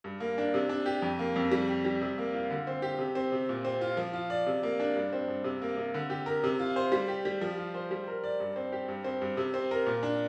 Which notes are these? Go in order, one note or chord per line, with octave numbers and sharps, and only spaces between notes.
G2
A#3
D4
C3
D4
G4
F2
A#3
F2
G3
G4
G3
C3
A#3
F4
D3
C4
G4
C3
C4
C3
A#2
C4
F4
F3
F4
D5
C3
A#3
D4
G2
C4
G2
C3
A#3
C3
D3
G4
A#4
C3
F4
C5
G3
G4
G3
F3
F4
C5
G3
A#4
D5
G2
C4
G4
G2
C4
G2
C3
C4
A#4
A#2
D4